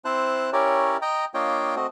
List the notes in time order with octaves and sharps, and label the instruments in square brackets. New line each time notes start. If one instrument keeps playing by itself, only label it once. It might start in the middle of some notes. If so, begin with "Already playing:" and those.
[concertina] C4 E4 C5 A5 F#6
C#4 E4 G4 A#4 C#5 D5
D#5 G5 A#5
A#3 D4 F4 C#5 D#5 G5
A3 C4 F#4 D#5